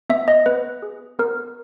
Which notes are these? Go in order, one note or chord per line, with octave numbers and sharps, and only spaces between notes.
B3 E5
D#5
B3 B4
G#4
B3 A#4